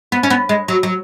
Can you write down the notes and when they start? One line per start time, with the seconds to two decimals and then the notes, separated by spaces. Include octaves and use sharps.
0.12 B3
0.23 C#4
0.30 B3
0.49 G#3
0.68 F#3
0.83 F#3